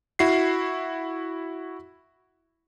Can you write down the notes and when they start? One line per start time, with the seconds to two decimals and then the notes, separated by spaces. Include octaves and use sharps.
0.19 E4 F#4 C7